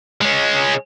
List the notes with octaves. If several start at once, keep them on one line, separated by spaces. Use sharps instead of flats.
G#3 C#4